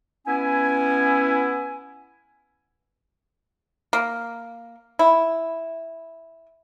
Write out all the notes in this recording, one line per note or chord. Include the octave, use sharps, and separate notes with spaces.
B3 C#4 E4 G#5
A#3
E4